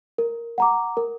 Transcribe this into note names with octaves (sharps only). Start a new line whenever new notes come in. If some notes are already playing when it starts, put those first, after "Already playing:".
A#4
F#5 A#5 D6
A#4